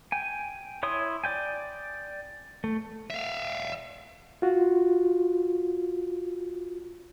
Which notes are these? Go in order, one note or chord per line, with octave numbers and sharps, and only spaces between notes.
G5 G#5
E4 C#5 C6 D#6
D5 G5 G#5
A3
E5 F5
F4 F#4